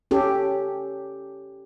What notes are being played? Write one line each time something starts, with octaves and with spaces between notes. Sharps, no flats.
C#4 G4 A4